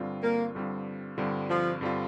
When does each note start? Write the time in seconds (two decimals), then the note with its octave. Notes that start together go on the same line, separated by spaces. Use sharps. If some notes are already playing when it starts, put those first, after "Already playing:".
Already playing: G2 D3 G3 C4 F4
0.23 A#3
0.55 G2 D3 G3 C4 F4
1.18 G2 D3 G3 C4 F4
1.50 F3
1.81 G2 D3 G3 C4 F4